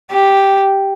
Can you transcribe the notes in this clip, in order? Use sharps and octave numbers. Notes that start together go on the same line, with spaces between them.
G4